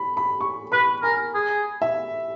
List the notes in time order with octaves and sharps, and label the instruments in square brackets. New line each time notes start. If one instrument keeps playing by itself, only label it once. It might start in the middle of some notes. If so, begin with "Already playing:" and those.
Already playing: [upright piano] B5
B5
C#6
[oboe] B4 [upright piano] B5
[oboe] A#4 [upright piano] G#5
[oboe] G#4
[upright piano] E5